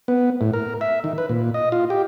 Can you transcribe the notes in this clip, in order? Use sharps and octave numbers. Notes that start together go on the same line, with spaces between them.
B3
A2
A#4
E5
D#3
B4
A#2
D#5
F4
G4